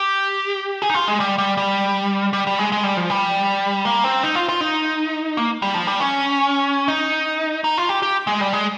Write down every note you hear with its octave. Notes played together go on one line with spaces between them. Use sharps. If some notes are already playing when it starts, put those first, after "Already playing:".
Already playing: G4
G#4
D#4
F4
G#3
G3
G3
G3
G3
G3
G#3
G#3
G3
F3
G3
A#3
C4
D#4
F4
F4
D#4
A#3
G3
F3
G3
C#4
D#4
D#4
F4
G4
G4
G#3
G3
G#3